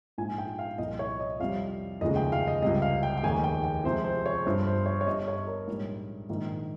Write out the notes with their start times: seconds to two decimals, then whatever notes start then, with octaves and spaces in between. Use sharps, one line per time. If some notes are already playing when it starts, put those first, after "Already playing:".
0.18 A#1 G#2 F3 G#5
0.38 G5
0.59 F5
0.78 C2 A#2 F3 D#5
0.99 C#5
1.20 D#5
1.40 F2 C3 G3 F5
2.01 F1 D#2 C#3 F3 G#3 D#5
2.16 G5
2.32 F5
2.48 D#5
2.62 C#2 C3 G3 D#5
2.82 F5
3.03 G5
3.17 G5
3.23 F1 D#2 D#3 G#3 G#5
3.44 G5
3.64 G5
3.84 F2 C3 F3 G#3 C5
4.05 C5
4.26 C#5
4.45 G1 G2 F3 C5
4.67 C5
4.86 C#5
5.01 C#5
5.07 G1 G2 G3 D#5
5.28 C#5
5.47 A#4
5.68 A#1 G#2 G3
6.29 A#1 G#2 D#3